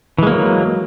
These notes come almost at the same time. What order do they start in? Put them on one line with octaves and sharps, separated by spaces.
E3 G#3 A#3 F#3